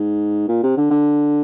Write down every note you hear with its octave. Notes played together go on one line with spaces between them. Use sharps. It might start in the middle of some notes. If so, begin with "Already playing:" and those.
Already playing: G#2
A#2
C3
D3
D3